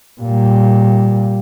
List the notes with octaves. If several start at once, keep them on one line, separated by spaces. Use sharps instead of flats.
A#2 G3